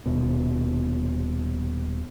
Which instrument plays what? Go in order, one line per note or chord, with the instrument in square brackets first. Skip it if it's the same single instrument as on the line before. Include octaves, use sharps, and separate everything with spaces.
[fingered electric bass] D#1 B2